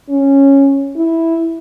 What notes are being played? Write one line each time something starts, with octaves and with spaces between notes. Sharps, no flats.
C#4
E4